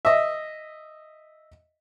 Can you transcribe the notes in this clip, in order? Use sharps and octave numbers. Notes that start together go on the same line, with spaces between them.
D#5 E5